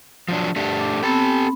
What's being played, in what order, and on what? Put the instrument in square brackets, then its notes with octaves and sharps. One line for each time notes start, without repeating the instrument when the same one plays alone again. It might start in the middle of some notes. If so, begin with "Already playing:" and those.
[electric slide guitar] F3 F#3 D4
A3 D4 G4
[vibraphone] D6
[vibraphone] B3 C4 B5 [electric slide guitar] G4 A4 A5